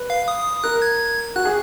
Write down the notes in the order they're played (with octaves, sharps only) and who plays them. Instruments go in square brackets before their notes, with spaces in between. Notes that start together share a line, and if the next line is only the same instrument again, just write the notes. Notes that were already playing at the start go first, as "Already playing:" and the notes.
Already playing: [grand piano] B4
[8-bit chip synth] F5
D#6
[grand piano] A#4 [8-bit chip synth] F#6
[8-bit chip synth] G#6
[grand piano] F#4 [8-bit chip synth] F#6
[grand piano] G#4